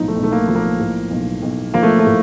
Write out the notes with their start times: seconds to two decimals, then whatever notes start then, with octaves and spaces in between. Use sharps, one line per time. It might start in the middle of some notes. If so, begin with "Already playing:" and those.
Already playing: B1 A2 F3 D#4
0.08 A3
0.16 B1
0.24 A3
0.32 A#3
0.48 F3
0.55 A#3
0.79 A2
1.11 B1
1.42 B1
1.74 F3 A#3
1.83 A3
1.99 A3
2.06 A2